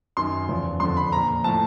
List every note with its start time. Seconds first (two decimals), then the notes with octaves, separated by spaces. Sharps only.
0.17 F#2 D#3 C6
0.48 E2 C#3 F3
0.80 F2 D3 F3 C6
0.97 B5
1.12 A#2 F3 A#5
1.44 A2 F3 A5